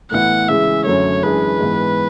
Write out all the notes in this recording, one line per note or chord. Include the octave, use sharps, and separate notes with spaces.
A2 E3 B3 E4 F#5
C#3 E3 G#3 E5
F#2 D3 F#3 A3 C#5
F#2 E3 G#3 D4 G#4 B4
G#2 E3 B3